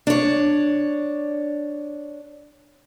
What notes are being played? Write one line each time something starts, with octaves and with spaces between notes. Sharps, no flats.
D4 C#5